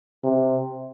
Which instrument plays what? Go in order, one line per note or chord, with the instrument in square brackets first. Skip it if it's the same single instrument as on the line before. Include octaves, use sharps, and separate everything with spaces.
[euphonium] C3